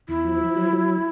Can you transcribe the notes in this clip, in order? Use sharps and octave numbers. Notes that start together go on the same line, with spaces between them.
E2 E4
F3
F3
F#3
F#3